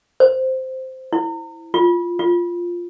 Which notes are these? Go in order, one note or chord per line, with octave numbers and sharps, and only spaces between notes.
C5
E4
F4
F4